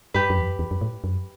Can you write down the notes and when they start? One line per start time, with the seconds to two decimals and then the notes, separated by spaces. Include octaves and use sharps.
0.14 G2 G4 B4
0.30 F#2
0.38 E2
0.45 F#2
0.59 E2
0.71 F#2
0.81 A2
1.04 F#2